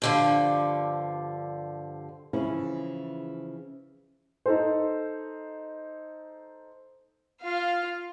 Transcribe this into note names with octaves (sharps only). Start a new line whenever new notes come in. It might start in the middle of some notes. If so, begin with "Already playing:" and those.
G2 D3 F3
C#3 E3 F3 C#4 E4
D#4 A4 C5
F4 F5